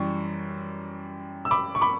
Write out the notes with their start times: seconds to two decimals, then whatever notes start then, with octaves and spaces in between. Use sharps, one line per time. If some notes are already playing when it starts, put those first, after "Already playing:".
Already playing: F#2 E3 G3 C#6
1.45 E6
1.51 B5 D6
1.75 C#6
1.81 B5 D6